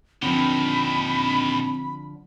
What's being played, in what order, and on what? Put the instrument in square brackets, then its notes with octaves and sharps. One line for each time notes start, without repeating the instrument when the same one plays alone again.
[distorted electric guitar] A#2 D#3 [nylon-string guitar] D3 F3 [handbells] C4 D4 [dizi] B5